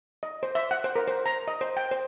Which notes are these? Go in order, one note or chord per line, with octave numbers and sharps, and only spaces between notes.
D#5
C5
E5
F#5
C5
A#4
C5
A#5
D#5
C5
G5
C5